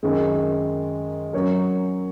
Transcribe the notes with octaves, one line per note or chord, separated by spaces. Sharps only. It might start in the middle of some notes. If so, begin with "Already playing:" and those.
F#2 D#3 G#3
F#3 C#4 A#4 C#5